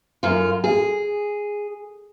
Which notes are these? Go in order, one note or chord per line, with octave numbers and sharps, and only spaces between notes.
F#2 F4
G#4